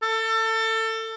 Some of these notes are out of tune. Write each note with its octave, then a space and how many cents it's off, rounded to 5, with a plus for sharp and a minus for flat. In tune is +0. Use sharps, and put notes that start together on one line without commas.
A4 +25